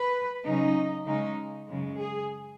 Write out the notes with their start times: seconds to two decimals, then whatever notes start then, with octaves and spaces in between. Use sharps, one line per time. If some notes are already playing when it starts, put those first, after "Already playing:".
Already playing: B4
0.44 C#3 F#3 C#4 D#4
1.06 C#3 G#3 C#4 D#4
1.67 F#2 C#3 G#3
1.98 G#4